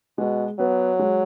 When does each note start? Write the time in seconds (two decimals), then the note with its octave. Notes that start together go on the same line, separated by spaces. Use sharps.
0.17 B2 G#3
0.59 F#3 B3
0.99 G#3